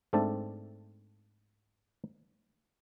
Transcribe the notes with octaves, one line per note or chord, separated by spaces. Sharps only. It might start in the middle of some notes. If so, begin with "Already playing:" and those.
G#2 A3 C4 D4 E5 A5